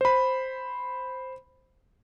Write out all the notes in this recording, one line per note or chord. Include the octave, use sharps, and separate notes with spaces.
C5 B5